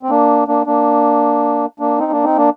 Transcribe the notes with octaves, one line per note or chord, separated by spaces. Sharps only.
C4
A#3 D4
A#3 D4
A#3 D4
A#3 D4
C4 D#4
A#3 D4
C4 D#4
A#3 D4